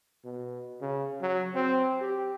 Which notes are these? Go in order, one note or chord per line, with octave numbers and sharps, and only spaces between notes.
B2
C#3
F#3
C4
G4